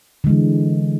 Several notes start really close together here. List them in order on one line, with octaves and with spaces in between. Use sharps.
D3 G#3 E3